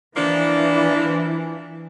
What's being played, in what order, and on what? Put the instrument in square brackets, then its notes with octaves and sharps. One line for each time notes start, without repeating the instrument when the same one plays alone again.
[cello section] E3 [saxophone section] F3 A#3 D4